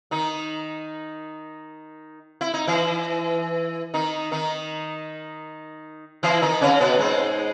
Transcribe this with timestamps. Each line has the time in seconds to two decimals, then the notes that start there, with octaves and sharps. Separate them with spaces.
0.11 D#3 D#4
2.41 E4
2.54 D#4
2.67 E3 E4
3.94 D#3 D#4
4.32 D#3 D#4
6.23 E3 E4
6.42 D#3 D#4
6.61 C#3 C#4
6.80 B2 B3
6.99 G#2 G#3